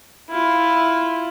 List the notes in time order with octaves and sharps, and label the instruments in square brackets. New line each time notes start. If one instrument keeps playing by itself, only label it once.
[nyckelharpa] E4 F4